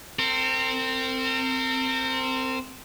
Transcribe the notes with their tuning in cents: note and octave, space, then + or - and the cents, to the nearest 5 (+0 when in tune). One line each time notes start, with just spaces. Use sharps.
C4 +0 A#4 -40